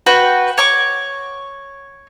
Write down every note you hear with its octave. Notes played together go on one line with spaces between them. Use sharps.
F#4 B4 G5
C#5 C#6 D6